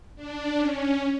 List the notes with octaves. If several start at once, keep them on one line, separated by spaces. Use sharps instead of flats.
D4
C#4